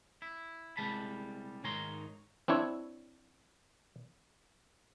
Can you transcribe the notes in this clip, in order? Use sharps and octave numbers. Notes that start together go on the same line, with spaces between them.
E4
C2 F#2 G3 G#3 A5 B5
G#2 D#3 C#5 A#5 C6
C4 D4 E4 C#5